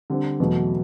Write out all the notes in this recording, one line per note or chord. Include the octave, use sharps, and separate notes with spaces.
D3 G3 C4
E2 B2 F#3 A3